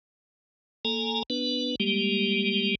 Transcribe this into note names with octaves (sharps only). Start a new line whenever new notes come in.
A#3 A4 G#5 A#5
B3 D4 B4
G3 G#3 A#3 G4